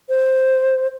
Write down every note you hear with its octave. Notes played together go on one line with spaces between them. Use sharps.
C5